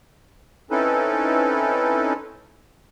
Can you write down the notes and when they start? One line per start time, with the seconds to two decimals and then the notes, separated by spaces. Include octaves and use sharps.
0.71 C4 C#4 D#4 E4 A4 B4